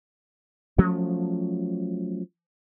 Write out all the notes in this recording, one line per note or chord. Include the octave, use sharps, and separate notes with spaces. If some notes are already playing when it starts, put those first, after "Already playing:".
F3 F#3 A3 C#4